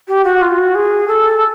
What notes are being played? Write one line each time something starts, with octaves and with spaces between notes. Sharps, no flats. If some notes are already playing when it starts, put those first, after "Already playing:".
G4
F#4
F4
F#4
G#4
A4